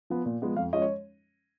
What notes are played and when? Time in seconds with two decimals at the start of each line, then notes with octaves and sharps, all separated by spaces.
0.10 F3 B3
0.25 A#2
0.42 F3 G#3 B3
0.56 F2 F5
0.73 F3 G#3 C#4 D#5
0.82 C#5